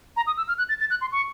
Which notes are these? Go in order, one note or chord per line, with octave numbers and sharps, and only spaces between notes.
A#5
D#6
E6
F6
F#6
A6
A6
F#6
C6
C#6